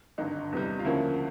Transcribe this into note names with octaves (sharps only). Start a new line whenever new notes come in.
G#1 G2 D3 D#4
E2 C3 E3 G3
F4
D2 C#3 F3 A#3 C#4 E4